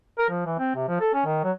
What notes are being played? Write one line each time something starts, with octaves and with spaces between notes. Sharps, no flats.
A#4
F3
E3
C4
C3
F3
A4
C#4
D#3
F#3